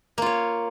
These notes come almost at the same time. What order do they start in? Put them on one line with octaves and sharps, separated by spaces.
A#3 F4 C#5